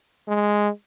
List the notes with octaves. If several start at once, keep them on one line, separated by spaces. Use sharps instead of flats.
G#3